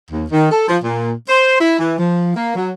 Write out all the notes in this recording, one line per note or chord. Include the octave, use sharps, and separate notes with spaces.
D#2
D#3
A4
F3
A#2
C5
E4
E3
F3
A#3
F#3